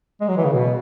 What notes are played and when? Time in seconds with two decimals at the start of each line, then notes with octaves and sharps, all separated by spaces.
0.21 G#3
0.28 F#3
0.37 E3
0.45 C#3
0.53 B2